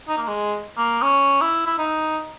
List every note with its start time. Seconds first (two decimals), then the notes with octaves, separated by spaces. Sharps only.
0.08 D#4
0.18 A#3
0.28 G#3
0.78 A#3
1.02 C#4
1.41 E4
1.67 E4
1.78 D#4